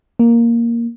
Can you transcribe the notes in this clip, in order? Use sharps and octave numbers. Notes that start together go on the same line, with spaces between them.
A#3